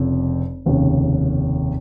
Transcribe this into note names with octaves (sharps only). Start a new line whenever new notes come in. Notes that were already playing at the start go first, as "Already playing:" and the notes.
Already playing: F1 F2 C#3
F1 D#2 C#3